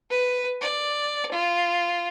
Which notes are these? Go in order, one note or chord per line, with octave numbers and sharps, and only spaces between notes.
B4
D5
F4